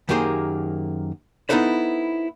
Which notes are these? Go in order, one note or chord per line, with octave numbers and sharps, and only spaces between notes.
F#2 D#3 A#3 G4 G#4 C5
B3 D#4 E4 A4 B4 C5